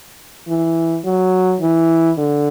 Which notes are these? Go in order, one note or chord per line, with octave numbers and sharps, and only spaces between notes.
E3
F#3
E3
D3